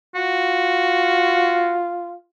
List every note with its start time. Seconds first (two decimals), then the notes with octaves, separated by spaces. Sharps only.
0.15 F4 F#4